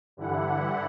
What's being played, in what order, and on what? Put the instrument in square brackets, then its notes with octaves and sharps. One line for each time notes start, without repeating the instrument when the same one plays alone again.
[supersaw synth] G2 D3 E3 G3 E4 F#5